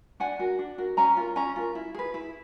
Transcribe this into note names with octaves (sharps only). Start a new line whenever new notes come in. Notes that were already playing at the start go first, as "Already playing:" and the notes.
D4 F#5 G#5
F#4 A#4
D4
F#4 A#4
C#4 G#5 A#5
F4 A#4
C#4 G#5 A#5
F4 A#4
E4
G#4 B4
E4